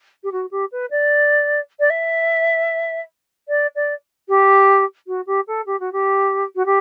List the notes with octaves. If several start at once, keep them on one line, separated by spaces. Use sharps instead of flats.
G4
F#4
G4
B4
D5
D5
E5
D5
D5
G4
F#4
G4
A4
G4
F#4
G4
F#4
G4